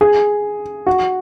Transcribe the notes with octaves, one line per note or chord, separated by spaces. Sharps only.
G#4
F#4